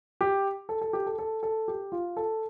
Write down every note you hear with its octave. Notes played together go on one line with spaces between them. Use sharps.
G4
A4
A4
G4
A4
A4
A4
G4
F4
A4